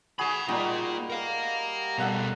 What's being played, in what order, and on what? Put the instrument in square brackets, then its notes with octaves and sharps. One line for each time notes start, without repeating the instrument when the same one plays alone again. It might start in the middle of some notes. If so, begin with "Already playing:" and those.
[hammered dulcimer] F#4 G#4 [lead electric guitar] G#5 B5
[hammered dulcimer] G3 D#4 F#4 [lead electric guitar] A#3 F4
[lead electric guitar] A#4 F5
[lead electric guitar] B2 G3 [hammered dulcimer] A4 F#5 A#5